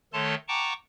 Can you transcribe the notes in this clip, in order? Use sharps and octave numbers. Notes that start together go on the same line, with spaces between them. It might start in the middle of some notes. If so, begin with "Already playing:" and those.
D#3 A3 A4 C#5 A5 C6
F#5 G5 A5 A#5 C#6 D6